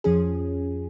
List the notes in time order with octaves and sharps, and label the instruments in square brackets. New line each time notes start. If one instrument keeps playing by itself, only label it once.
[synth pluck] F2 F3 C#4 G#4